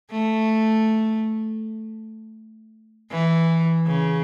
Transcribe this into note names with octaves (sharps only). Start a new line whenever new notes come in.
A3
E3
C#3